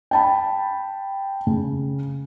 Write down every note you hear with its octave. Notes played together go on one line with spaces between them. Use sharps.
G5 A5 B5
C#3